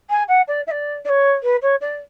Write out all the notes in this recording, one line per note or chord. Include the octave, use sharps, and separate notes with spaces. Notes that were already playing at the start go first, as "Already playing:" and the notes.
G#5
F#5
D5
E5
D5
D5
C#5
B4
C#5
D5